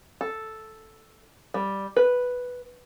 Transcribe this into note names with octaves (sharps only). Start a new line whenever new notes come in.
A4
G3
B4